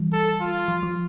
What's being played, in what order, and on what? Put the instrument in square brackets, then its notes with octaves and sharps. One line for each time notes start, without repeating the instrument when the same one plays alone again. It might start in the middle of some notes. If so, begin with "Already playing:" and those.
Already playing: [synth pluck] E3 G3
[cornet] A4
F4
[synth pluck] F3
F3